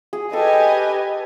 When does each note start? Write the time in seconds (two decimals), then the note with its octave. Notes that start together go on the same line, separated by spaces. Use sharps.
0.13 G#4
0.33 G4 A4 B4 D#5 G#5